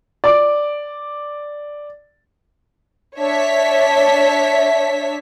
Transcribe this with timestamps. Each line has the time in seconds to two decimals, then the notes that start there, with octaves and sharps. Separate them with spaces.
0.24 D5 D6
3.19 D4 C#5 E5 A5 B6